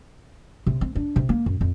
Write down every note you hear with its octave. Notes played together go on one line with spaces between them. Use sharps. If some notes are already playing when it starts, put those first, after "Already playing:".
C3
C4
D4
C3
A#3
F#2
F2